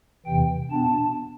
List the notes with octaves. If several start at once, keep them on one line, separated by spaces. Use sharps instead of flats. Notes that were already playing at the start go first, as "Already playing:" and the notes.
E2 C3 E3 G5
B2 B3 D4 A5